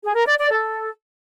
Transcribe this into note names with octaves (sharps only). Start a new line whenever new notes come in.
G#4
A#4
D5
D5
A4